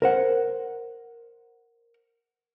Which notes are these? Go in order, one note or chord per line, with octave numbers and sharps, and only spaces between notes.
A#4 C5 F#5